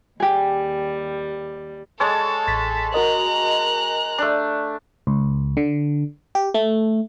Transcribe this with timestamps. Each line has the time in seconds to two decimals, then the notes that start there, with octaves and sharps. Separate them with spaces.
0.20 D#2 G3 G4 G#4
2.00 G#3 A4 C#5 A5
2.47 A1 A6 B6
2.94 F#4 A#4 D#5 A#5 F#6
4.18 A3 D4
5.07 C#2
5.57 D3
6.35 G4
6.54 A3